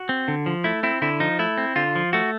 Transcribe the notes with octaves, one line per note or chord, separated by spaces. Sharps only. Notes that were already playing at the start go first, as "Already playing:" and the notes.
Already playing: F#4
C4
D3
F3
A3 E4
C4 E4
D3 E4
F3 D#4
A3 E4
C4
D3 F4
F3
A3 F#4